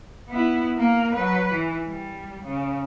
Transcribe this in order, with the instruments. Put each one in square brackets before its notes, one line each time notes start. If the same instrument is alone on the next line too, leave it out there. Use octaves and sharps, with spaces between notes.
[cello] B3 E4
A#3 A#4
F#3 B4
E3
G3
C#3